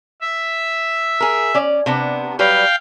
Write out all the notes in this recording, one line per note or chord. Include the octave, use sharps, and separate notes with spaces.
E5
G#4 A#4
C#4 D5
C3 B3 D4
F#3 G3 B4 F5 G5